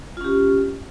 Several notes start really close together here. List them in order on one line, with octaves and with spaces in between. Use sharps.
F4 C#4 G4